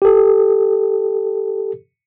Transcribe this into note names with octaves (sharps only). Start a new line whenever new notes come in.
G4 A4